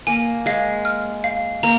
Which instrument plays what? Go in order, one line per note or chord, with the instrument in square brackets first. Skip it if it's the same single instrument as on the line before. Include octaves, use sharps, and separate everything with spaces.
[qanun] A#3 [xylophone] G#5
[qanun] G#3 [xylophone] F5
[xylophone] F6
F5
[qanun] A#3 [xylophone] A#5